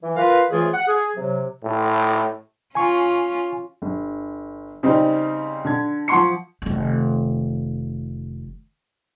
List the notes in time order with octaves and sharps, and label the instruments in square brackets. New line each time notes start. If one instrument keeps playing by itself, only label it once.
[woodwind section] E3
F4 A#4 B4 F5
C#2 E3 F3 A3 F4 G#4
F#5
G#4
C3 F#3
[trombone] A2
[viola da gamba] C#4 F4 [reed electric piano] G#5 C#6
[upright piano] G1
C#3 G3 C4 D#4
D3 G#6
F3 F#5 C6 C#6 C#7
[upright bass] F1 D#3